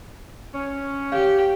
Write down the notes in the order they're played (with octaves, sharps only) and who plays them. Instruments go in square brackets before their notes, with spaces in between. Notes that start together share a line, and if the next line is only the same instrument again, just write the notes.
[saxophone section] C#4
[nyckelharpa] G4 [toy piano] C#5 F5